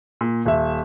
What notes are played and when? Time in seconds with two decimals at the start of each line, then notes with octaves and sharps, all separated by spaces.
0.21 A#2
0.46 D#1 E5